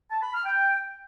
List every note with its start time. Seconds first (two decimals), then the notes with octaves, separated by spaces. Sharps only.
0.11 A5
0.22 B5
0.34 F6
0.45 G5